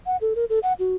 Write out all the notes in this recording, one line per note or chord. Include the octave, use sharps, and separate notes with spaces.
F#5
A4
A#4
A4
F#5
F#4